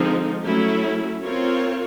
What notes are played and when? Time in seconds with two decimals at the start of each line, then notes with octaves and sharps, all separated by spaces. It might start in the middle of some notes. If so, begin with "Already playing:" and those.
Already playing: D3 F3 G#3 C4 D#4
0.43 F#3 A3 C#4 E4
1.23 C4 F4 A#4 C#5